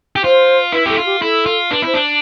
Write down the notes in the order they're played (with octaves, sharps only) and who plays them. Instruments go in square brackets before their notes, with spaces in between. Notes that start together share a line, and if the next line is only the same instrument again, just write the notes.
[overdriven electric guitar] G4
[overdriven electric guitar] F4 [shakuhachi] C5
[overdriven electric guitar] E4 [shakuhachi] B4
[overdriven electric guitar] G4 [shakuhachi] A4
[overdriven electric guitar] F4
[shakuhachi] G4
[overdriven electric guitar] E4 [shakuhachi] A4
[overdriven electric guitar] F4
[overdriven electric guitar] D4 [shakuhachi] B4
[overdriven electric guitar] E4 [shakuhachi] C5
[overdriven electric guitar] D4